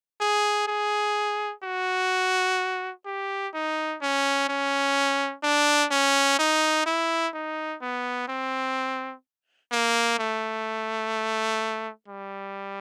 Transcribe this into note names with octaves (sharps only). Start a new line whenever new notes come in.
G#4
G#4
F#4
G4
D#4
C#4
C#4
D4
C#4
D#4
E4
D#4
B3
C4
A#3
A3
G3